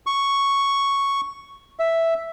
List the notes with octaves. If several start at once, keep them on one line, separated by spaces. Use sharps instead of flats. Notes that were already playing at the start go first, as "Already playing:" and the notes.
C#6
E5